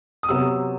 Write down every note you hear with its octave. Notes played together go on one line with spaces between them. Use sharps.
D#6
C3 F#3 B3 E6